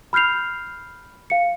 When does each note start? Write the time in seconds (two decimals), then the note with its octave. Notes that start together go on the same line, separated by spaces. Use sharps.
0.13 B5 F6 G6 C7 F7
1.30 F5 C#7